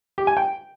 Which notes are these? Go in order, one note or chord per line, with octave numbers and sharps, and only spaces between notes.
G4
G#5
G5